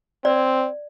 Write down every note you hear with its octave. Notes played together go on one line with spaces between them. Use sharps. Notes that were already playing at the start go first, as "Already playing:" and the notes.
C4 D5